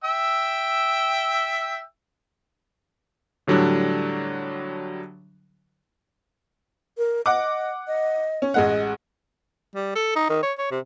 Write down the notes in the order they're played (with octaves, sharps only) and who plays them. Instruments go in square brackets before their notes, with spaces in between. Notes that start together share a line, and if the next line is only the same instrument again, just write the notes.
[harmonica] E5 G5 E6
[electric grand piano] A2 D3 F#3 G3 D4
[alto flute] A#4
[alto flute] D#5 [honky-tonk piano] F#5 D6
[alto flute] D#5
[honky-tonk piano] C#4
[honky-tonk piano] A1 G#3 F#5 [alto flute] D#5
[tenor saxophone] G3
A4
D#4
D#3
C#5
C#5
C3